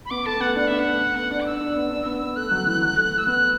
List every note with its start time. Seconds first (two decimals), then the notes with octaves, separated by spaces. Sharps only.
0.05 B5
0.10 B3 D6
0.26 A3 A5
0.40 B3 F#5
0.56 D4 F#5
0.67 B3 E5
0.79 F#5
0.86 A3
1.16 B3
1.31 D4
1.40 D6
1.46 D4 E6
1.61 D4
1.76 B3
1.91 D4
2.06 B3
2.21 B3
2.36 A3 F#6
2.51 F#3
2.66 E3
2.81 F#3
2.96 A3
3.12 A3
3.18 E6
3.26 B3 F#6